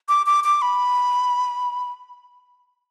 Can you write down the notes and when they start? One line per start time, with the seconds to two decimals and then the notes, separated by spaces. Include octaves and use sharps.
0.09 D6
0.26 D6
0.44 D6
0.62 B5